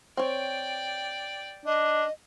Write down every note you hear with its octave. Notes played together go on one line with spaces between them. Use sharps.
C4 C#5 D5 G5
D4 D#5